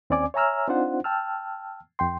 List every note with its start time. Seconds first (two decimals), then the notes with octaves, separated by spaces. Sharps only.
0.10 D#2 C4 C#4 D5 G#5 D6
0.34 C#5 E5 G#5 A#5 E6 F6
0.68 C4 D4 D#4 F4 C5 F#5
1.04 G5 A5 E6 F6
1.99 F2 G5 C6